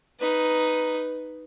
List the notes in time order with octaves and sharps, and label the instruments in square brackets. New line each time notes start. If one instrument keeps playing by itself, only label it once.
[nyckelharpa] D#4 B4